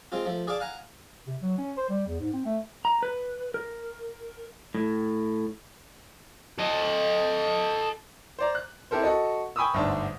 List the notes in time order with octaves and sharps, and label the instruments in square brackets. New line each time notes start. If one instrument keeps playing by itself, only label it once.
[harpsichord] G#3 C4 F4
F3 A3
G#4 D5 F5 A5 D6
F5 F#5 G#5 A#5
[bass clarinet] C3
F#3
C#4
C5
G3
E2
G#2
C4
A3
[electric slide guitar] A#5
B4
A#4
A2
[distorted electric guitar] A4 D#5
[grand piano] C5 D5 A#5
F#6
C4 E4 G4 A4 A#4 C5
F#4 A4 D#5
G5 G#5 B5 C#6 D#6 E6
G1 D2 G#2 D4 A5